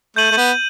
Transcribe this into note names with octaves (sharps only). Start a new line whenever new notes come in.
A3 G6 D#7 F#7
A3
B3